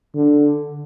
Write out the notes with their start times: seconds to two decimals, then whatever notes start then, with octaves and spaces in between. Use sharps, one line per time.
0.15 D3